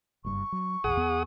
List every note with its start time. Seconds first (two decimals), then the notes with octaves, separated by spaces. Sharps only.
0.25 F#1 G2 C#6
0.52 F#3
0.84 A#1 E2 G#4 F#5 D#6
0.97 E2 B3